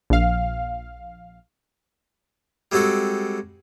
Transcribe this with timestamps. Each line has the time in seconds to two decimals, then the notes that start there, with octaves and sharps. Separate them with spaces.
0.10 A#1 F5
2.72 G3 G#3 C4 F#4 A4